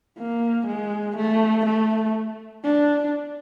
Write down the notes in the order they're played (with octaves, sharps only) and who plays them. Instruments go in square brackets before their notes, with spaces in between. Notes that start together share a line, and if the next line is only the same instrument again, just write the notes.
[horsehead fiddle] A#3
G#3
A3
A3
D4